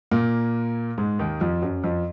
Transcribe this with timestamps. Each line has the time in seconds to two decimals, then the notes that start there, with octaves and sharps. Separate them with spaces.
0.11 A#2 A#3
0.98 G#2 G#3
1.19 D#2 D#3
1.41 F2 F3
1.62 F#2 F#3
1.84 F2 F3